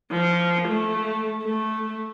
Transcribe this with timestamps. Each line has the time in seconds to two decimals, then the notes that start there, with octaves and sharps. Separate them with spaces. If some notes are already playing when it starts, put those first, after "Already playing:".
0.11 F3
0.68 A3
1.43 A3